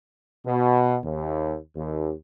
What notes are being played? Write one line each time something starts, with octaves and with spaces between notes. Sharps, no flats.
B2
D#2
D#2